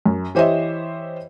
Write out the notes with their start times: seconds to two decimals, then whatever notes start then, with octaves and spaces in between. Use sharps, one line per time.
0.06 F#2
0.35 E3 G4 C5 C#5 D#5 E5